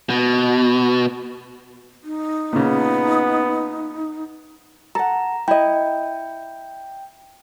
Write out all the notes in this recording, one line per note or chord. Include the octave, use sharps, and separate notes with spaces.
B2
D#4
A#2 C#3 B3
A4 F#5 A#5
E4 D#5 G5